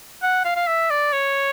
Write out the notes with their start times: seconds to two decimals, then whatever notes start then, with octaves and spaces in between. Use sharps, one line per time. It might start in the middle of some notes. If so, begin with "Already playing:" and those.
0.22 F#5
0.45 F5
0.56 F5
0.67 E5
0.90 D5
1.12 C#5